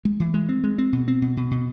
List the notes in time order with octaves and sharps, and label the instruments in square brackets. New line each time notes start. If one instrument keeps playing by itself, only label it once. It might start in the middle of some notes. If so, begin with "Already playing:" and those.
[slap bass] G#3
E3
G#3
C4
G#3
C4
B2
C4
B2
B2
B2